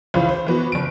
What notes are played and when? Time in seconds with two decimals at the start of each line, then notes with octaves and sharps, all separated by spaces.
0.14 C#2 E3 F4 C5 B5
0.29 C5
0.47 E3 B3 F#4
0.72 F#1 D7